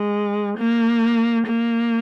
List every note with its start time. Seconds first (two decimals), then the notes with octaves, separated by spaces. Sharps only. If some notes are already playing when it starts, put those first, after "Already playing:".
Already playing: G#3
0.59 A#3
1.47 A#3